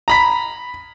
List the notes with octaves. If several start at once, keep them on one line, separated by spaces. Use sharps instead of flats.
A#5 B5 B6